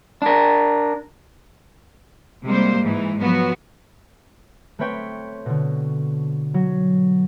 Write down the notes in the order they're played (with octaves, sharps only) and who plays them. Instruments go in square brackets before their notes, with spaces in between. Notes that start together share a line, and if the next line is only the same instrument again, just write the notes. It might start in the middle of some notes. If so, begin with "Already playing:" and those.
[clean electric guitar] D4 A#4
[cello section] C3 G3 G#3 A#3 C5
G#2 E3
F3 F#3 B3 F#4
[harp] A3 C4 B4 C#5 G5
B2 D3
F#3